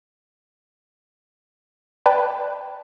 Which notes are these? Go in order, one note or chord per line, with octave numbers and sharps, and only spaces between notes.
B4 D5 G5 A5 B5